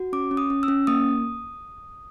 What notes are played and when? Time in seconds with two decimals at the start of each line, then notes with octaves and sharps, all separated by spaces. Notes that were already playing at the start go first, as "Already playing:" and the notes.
Already playing: F#4
0.13 C#4 D6
0.31 C#4
0.37 D#6
0.50 C#4
0.63 E6
0.68 C#4
0.87 A#3 D#6